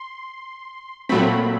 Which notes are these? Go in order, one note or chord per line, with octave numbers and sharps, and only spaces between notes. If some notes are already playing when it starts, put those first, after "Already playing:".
Already playing: C6
A#2 F#3 A3 C4 B5